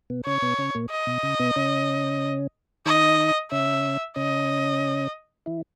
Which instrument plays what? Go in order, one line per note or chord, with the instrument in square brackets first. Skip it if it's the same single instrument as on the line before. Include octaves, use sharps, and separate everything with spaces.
[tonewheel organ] B2 B3
[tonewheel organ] C#3 C#4 [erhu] C#5
[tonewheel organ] B2 B3
C#3 C#4
A#2 A#3
[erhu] D#5
[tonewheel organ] B2
C#3
B2 B3
C#3 C#4
[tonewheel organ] D#3 D#4 [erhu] D#5
[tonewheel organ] C#3 C#4 [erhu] E5
[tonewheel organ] C#3 C#4 [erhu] D#5
[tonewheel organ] E3 E4